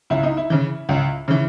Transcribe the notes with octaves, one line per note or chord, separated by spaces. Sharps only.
C#2 E4
D#4
E4
C#3 E3
C#2
C#3 E3